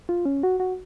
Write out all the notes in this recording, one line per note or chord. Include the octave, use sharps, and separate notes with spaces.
F4
C#4
F#4
F#4